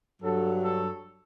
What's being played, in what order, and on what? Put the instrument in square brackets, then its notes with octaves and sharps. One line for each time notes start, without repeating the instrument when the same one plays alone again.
[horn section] G2 F#3 A4
A4